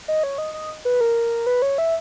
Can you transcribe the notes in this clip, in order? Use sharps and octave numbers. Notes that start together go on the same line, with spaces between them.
D#5
C#5
D#5
D#5
B4
A#4
B4
C#5
E5